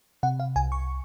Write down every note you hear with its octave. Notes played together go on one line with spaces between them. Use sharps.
C3 F#5
F5
C2 G#5
C#6